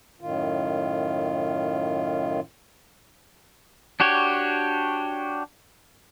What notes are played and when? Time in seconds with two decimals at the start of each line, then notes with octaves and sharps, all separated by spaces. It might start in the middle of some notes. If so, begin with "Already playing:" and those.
0.21 F#2 A2 D#3 F4
4.00 D4 F#4 G4 C#5